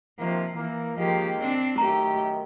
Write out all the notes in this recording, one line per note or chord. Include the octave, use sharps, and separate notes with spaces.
C3 D#3 F3 A#3
E3 A#3
D#3 F3 G#3 A#3 G4
C4 D4
F#2 D#3 A3 G4 A#5